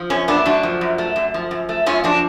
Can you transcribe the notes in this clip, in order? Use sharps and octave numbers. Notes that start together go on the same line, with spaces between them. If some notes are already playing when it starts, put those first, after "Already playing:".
Already playing: F3
F#2 C#4
A3 B3 D4
F#2 D4 F#4
F3
F#2
A3
F#2
F3
F#2
A3
F#2 C#4 F4
F3 D4 F#4